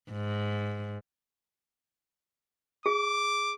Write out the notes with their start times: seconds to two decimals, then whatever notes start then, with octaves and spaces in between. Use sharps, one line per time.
0.12 G#2
2.86 G#4 D6